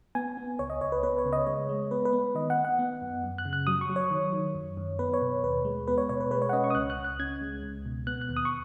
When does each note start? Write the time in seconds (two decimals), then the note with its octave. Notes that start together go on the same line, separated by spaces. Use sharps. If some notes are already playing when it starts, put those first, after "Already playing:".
0.15 B3 G#5
0.37 B3
0.59 C#2 C#5
0.70 D#5
0.81 C#2 C#5
0.92 B4
1.03 B3 B4
1.18 C#5
1.25 C#3
1.33 D#5
1.47 G#3 C#5
1.69 G#3
1.91 B3 B4
2.05 B4
2.13 B3
2.35 D#3 D#5
2.50 F#5
2.58 B3
2.65 F#5
2.79 B3
3.02 F#2
3.24 F#2
3.38 F#6
3.45 C#3
3.53 F#6
3.67 F#3 D#6
3.81 C#6
3.89 F#3
3.96 C#5
4.11 D#3
4.33 D#3
4.55 F#2
4.77 F#2
4.99 B3 B4
5.14 C#5
5.22 B2
5.43 D#2 B4
5.65 G#3
5.87 B3 B4
5.98 C#5
6.09 B2 C#5
6.20 B4
6.31 G#3 B4
6.42 C#5
6.49 F#5
6.53 C#4 D#5
6.64 C#6
6.70 D#6
6.75 C#2 F#6
6.90 F#6
6.97 C#2
7.04 F#6
7.19 C#4 G#6
7.41 G#3
7.63 C#2
7.86 B2
8.07 B3 F#6
8.21 F#6
8.29 D#2
8.37 D#6
8.45 C#6